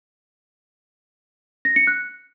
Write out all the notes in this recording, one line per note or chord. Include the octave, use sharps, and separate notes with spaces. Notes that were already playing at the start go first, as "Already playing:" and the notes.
A#6
C#7
F#6